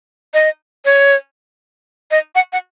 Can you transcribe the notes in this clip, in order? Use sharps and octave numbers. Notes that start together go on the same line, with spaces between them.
D#5
C#5
D#5
F#5
F#5